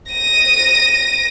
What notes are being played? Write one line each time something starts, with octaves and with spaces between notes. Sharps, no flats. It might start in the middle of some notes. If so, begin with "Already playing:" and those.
A#6 D#7